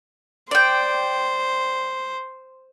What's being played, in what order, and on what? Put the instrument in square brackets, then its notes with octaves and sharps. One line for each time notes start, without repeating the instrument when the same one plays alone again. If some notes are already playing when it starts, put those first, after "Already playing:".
[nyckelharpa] C5 [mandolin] D5 G5